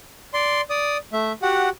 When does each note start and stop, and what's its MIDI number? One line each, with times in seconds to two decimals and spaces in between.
0.34 0.61 74
0.34 0.61 84
0.70 0.97 74
0.70 0.97 87
1.13 1.32 57
1.13 1.32 76
1.42 1.69 66
1.42 1.69 67
1.42 1.69 78